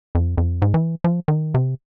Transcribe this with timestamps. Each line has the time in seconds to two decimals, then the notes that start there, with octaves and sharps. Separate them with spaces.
0.15 F2
0.37 F2
0.62 G#2
0.74 E3
1.04 F3
1.28 D#3
1.54 C3